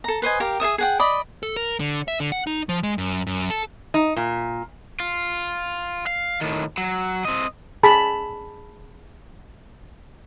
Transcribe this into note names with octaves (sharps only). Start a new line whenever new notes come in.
A4 A#5
B4 C5 D#5 G#5
G4 A#4 F5
G#4 A4 E5 D#6
G#4 F#5 G5
D5 D#5 B5
A4
A#4
D3
E5
D3
F#5
D#4
F3
G#3
F#2
F#2
A4
D#4
A#2
F4
F5
A2 D#3
F#3
C4 D#5
G#4 A5 B5